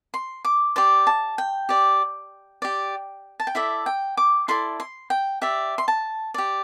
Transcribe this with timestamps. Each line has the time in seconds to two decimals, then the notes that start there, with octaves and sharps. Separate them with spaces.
0.14 C6
0.45 D6
0.76 G4 D5 C6
1.07 A5
1.38 G5
1.69 G4 D5
2.62 G4 D5
3.40 A5
3.47 G5
3.55 E4 A4 D5 E5
3.86 G5
4.17 D6
4.48 E4 A4 D5 C6
4.80 C6
5.10 G5
5.42 G4 D5 E5
5.78 C6
5.88 A5
6.34 G4 D5